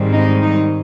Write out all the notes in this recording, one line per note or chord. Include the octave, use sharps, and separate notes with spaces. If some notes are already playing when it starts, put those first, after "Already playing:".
Already playing: G#2 D#3 G3 C4
D#4
D#4